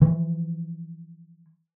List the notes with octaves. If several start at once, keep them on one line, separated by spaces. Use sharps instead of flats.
E3 F3